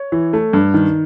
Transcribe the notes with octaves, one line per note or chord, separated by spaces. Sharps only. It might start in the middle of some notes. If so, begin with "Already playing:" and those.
Already playing: C#5
E3
A3
G2
D#3